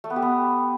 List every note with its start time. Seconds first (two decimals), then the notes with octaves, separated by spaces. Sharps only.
0.04 A3
0.10 B3
0.16 G4
0.22 B3